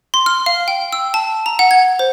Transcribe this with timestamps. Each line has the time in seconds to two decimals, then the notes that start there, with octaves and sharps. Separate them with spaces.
0.14 C6
0.26 F6
0.46 F5
0.68 G5
0.92 E6
1.14 A5
1.46 A#5
1.59 F#5
1.71 G#6
1.99 C5